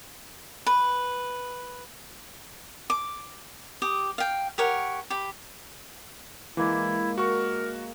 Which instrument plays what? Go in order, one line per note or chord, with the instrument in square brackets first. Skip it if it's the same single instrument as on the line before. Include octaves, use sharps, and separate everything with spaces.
[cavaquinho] B4
D6
G4 D6 D#6
F5 G5
G4 A#4 C#5 F#5
G4 B5
[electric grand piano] E3 [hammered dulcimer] G#3 A#3 D6 [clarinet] E4
[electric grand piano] F#4 C#6 [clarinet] A#4